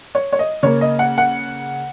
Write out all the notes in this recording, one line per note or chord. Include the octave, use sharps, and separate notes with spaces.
C#5
C#5
D#5
C#3 A#3 C#5
D#5
F#5
F#5